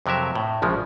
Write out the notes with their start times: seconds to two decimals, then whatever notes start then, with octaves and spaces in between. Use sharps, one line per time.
0.06 F2 C3 F#3 A#4 E5
0.35 A2
0.62 A#1 C#3 F3 G#3